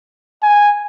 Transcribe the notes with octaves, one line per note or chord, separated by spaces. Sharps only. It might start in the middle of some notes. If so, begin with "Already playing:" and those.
G#5